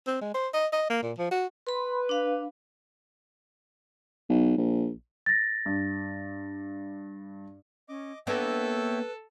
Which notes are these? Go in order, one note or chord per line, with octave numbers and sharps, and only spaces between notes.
C4
G#3
C5
D#5
D#5
A#3
A#2
F3
F#4
B4 B5 C6
D4 F5
B1
A#1
A6 A#6
G2
C#4 D#5 D6
A#3 B3 D4 A4 B4 C#5 E5 G5